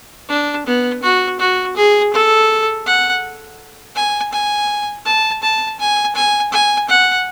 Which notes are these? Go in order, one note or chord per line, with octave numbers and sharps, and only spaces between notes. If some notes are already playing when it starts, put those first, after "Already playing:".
D4
B3
F#4
F#4
G#4
A4
F#5
G#5
G#5
A5
A5
G#5
G#5
G#5
F#5